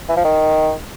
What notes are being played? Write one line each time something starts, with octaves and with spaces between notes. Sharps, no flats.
E3
F3
D#3